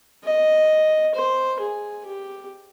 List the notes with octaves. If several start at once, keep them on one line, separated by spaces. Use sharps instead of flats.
D#5
C5
G#4
G4